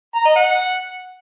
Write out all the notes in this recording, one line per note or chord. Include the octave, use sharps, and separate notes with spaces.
A#5
D#5
F#5